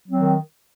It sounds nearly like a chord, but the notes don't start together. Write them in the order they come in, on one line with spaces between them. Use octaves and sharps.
F#3 C4 D#3